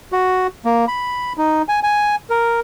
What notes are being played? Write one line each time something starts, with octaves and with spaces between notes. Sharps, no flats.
F#4
A#3
B5
D#4
G#5
G#5
A#4